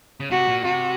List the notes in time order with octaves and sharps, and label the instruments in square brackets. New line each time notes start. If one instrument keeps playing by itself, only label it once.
[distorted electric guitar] C#3
[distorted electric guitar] C3 [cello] F#4
[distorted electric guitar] A#2
[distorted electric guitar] C3 [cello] F#4